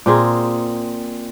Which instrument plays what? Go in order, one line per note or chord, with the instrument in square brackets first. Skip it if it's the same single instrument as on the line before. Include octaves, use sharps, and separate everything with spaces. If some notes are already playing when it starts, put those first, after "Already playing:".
[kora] A#2 C4 G#4 A#4